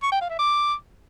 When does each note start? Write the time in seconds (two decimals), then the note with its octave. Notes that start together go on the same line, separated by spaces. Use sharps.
0.03 C#6
0.12 G5
0.21 F5
0.30 E5
0.39 D6